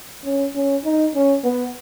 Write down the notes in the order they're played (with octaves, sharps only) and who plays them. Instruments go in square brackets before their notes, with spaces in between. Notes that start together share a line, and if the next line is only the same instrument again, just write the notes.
[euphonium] C#4
C#4
D#4
C#4
B3